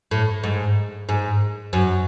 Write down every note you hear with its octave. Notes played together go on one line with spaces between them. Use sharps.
A2
G#2
G#2
F#2